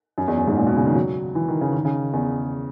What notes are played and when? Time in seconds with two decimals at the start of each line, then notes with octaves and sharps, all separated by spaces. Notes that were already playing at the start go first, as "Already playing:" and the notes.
0.18 F#2
0.28 E2
0.37 F#2
0.47 G#2
0.57 A#2
0.67 B2
0.76 C#3
0.86 D#3
0.96 F#3
1.35 E3
1.48 D#3
1.61 C#3
1.73 D#3
1.85 C#3
2.13 E2